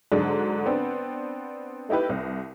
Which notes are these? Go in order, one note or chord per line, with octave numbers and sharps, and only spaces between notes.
G#2 D3 F#3 G#3 D4
B3 C4 D4
A3 D#4 E4 G4 B4
C2